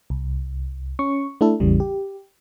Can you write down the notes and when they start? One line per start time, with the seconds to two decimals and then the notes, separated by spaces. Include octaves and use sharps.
0.10 C2
0.99 C#4 C#6
1.41 A3 D4 E4 A4
1.60 A1 E2 C#3 E3 G3
1.80 G4